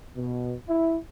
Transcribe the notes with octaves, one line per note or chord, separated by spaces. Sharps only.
B2
E4